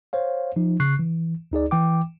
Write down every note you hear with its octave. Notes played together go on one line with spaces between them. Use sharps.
C5 C#5 F5
F3 D#4
C#3 C#6 F#6 C7
E3
D2 D#4 G#4 D5
E3 G5 D6